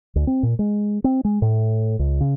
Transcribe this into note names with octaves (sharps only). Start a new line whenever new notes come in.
D2
C4
A#2
G#3
C4
G#3
A2
C#2
C#3